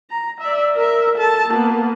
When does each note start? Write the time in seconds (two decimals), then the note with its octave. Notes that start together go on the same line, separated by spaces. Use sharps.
0.10 A#5
0.41 D5 E5
0.75 A#4 E5
1.17 A4 A5
1.49 A#3 B3